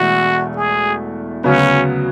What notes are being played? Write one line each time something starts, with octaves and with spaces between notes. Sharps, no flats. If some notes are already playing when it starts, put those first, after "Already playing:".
Already playing: E1 E2 B2 A3 E4 F#4
G#4
D2 C#3 F#3 B3 C#4 F#4